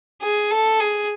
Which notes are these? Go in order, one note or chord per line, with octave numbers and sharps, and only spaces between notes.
G#4
A4
G#4